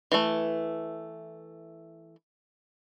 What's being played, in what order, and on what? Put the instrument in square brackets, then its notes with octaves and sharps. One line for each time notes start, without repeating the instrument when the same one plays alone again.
[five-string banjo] E3 A3